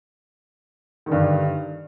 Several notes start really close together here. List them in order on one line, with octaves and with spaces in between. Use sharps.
D#3 D3 G2